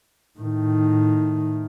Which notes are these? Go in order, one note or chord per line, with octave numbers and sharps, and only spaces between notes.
A2 D#3